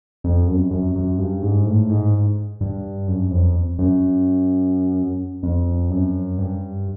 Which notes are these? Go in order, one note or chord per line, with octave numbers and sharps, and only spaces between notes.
F2
F#2
F#2
F#2
G2
G#2
A2
G#2
G2
F#2
F2
F#2
F2
F#2
G2